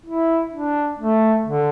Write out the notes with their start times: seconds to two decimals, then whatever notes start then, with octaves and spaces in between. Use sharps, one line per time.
0.06 E4
0.52 D4
0.99 A3
1.47 D3